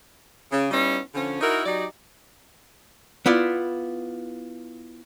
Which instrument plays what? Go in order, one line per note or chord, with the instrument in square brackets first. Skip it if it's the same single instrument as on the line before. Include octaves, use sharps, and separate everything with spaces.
[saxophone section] C#3
G3 B3 C#4 D#4 E4
D3 F3 C#4
D#4 E4 F#4 A#4
F#3 D#4 G4 D5
[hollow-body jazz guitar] B3 E4 F4 D5